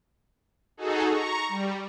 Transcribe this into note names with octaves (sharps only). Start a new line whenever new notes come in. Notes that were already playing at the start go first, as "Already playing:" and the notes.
D#4 F#4 G#4 A4
A#5 C#6
G3